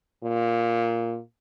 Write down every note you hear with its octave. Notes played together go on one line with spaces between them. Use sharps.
A#2